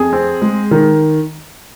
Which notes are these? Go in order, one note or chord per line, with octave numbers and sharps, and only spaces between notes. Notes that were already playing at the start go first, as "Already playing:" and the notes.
Already playing: F2 G#4
C4
G#3
D#3